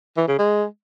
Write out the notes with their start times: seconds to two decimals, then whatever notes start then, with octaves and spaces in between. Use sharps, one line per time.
0.17 E3
0.28 C#3
0.39 G#3